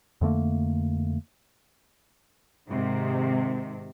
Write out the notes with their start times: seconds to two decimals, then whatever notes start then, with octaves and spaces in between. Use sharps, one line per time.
0.21 F2 D3 A3 A#3
2.68 G#2 C3 D#3